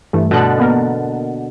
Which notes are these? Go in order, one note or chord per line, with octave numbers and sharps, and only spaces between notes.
G2 E3 A3
B2 D3 A4 D#5 F#6
A#3 B3 A#4